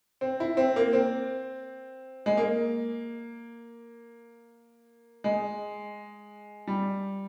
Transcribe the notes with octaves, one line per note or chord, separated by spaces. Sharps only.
C4
E4
C4
A#3
C4
G#3
A#3
G#3
G3